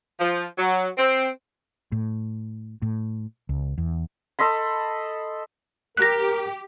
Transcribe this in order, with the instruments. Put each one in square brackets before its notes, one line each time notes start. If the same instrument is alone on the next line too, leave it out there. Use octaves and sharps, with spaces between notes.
[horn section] F3
F#3
C4
[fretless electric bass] A2
A2
C#2
E2
[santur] A4 D#5 B5 C6
[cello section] G4 [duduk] A#4 [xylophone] F#6 A#6